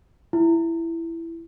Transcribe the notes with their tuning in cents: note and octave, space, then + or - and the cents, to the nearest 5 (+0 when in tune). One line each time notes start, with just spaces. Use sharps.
E4 +10